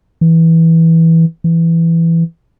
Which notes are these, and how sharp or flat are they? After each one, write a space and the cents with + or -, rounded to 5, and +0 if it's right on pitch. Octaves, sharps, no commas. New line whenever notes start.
E3 -10
E3 +10